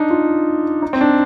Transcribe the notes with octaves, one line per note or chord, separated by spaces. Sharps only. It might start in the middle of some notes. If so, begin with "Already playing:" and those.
Already playing: D4 D#4
F4
D#4
C4
D4